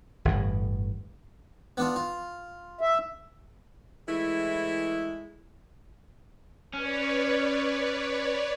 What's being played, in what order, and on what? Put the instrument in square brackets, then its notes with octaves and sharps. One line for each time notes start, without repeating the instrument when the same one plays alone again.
[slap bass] G1 E2 A2
[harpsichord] B3 D4 F4
F4
[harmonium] E5
[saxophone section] E3 G#3 A3 E4
[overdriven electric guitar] C#4 [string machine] B4 C#5 D5